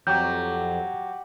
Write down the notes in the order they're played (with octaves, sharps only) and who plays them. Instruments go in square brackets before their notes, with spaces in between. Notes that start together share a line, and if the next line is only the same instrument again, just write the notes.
[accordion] F2 [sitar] F#3 [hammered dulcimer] G4 [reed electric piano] G6